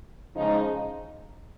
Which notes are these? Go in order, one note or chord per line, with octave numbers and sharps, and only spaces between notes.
C#3 F3 G#3 D#4